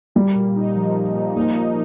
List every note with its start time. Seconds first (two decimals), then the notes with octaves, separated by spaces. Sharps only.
0.15 G3 A#3
0.35 A#2
0.56 D#4
0.76 F3
0.96 A#2
1.16 A#2
1.36 A#3 D#4
1.56 A#2